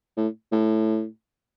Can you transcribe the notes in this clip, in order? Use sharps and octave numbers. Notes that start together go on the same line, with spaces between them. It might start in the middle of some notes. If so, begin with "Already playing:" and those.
A2
A2